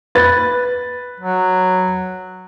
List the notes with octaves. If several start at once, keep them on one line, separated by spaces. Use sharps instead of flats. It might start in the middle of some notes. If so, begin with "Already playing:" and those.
B4 A6
F#3